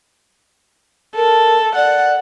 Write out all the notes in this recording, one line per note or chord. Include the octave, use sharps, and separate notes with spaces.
A4 A#4
D5 F#5